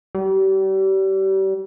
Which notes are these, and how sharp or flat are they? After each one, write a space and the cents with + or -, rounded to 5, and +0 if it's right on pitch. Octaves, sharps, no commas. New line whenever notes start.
G3 -35